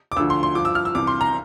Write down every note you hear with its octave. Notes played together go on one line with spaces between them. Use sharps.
D6
D2 D3 F3 E6
C6
C6
G2 F3 D6
E6
F6
E6
C2 C3 E3 D6
C6
A#5